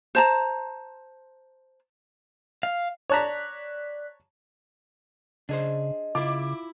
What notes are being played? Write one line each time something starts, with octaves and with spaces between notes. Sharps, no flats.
C5 A5 A#5
F5
C#5 D5 A5 A#5 F#6 B6
C#3 D4 G#4 C5 D#5
C#3 E4 F4 D6